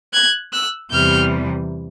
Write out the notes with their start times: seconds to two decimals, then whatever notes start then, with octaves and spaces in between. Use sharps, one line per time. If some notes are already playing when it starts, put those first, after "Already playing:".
0.13 F#6 G#6
0.52 E6 F#6
0.91 E2 C3 E3 G3 F6 G6